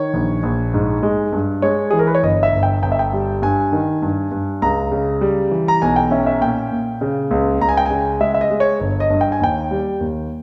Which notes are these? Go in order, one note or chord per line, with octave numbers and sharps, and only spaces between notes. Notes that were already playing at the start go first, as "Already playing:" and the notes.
Already playing: D#3 C#5
A#1
A#1
G#2
G#3
G2
G#3 C#5
E3 G#4
A#4
B4
C#5
G1 D#5
E5
G1
G5
G1 G5
E5
G5
G3
G2 G#5
D#3
G2
G2
C#2 A#5
C#3
G3
E3
A#5
B1 G#5
G5
C#4 E5
E5
A#2 G5
A#2
C#3
C#2
C#2 A#5
G#5
G5
C#3 G#5
G#3 E5
E5
D#5
G#3
C#5
G1 C#5
D#5
G2
G5
G#5
D#2 G5
G3
D#2